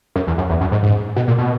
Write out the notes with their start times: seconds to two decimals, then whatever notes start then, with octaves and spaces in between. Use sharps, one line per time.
0.16 F#2
0.27 E2
0.38 F#2
0.49 E2
0.61 F#2
0.72 G#2
0.83 G#2
1.16 B2
1.28 A#2
1.38 B2